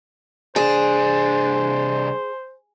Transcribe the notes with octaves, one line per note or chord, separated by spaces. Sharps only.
C2 D4 G#4 C5